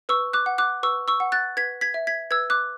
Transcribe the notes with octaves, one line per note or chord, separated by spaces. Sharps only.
B4 C#6 E6
D6 F#6
F#5
D6 F#6
B4 C#6 E6
C#6 E6
F#5
F#6 A6
B4 G#6 B6
G#6 B6
E5
G#6 B6
B4 E6 G#6
D6 F#6